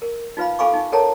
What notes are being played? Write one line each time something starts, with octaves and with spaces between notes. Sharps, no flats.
A#4
D#4 F4 B4 F5 B5
A4 F5 G#5 B5 C#6 D6
D#4
A4 A#4 C#5 F#5 A5 A#5